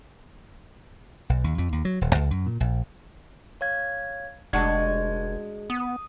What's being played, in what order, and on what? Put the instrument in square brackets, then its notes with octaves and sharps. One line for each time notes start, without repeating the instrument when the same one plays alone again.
[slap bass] B1
D#2
F2
D#2
F#3
D#1
C#2
F#2
A#2
A#1
[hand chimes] C#5 F5 G#6
[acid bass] F1 [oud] G#3 D4 F#4 [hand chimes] G#6
[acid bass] B3 [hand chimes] D#6